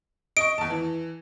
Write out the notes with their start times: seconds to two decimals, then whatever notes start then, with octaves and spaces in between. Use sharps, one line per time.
0.37 D#5 C#6 D7
0.58 E2 A5
0.70 E3